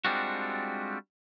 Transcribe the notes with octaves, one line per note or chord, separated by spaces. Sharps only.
G3 G#3 C4 D4 F4 F#4